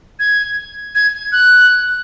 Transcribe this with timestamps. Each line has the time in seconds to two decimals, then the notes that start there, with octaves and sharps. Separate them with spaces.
0.19 G#6
0.95 G#6
1.32 F#6